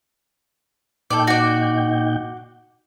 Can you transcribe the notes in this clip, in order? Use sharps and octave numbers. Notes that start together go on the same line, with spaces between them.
A#2 D#4 A4 D5 G5
F#4 D5